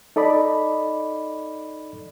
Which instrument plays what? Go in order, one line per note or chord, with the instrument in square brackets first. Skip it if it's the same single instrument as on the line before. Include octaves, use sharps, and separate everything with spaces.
[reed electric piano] D#4 A4 D5 D#5 B5